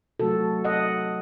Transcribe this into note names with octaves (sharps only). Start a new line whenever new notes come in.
C3 F#3 A3 F#4 A4
D#5 F#5